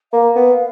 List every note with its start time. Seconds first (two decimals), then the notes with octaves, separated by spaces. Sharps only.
0.12 A#3 F5
0.36 B3